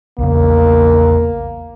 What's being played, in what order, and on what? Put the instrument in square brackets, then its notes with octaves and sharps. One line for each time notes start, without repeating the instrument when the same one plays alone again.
[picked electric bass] A#1 E2 C#3 [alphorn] A#3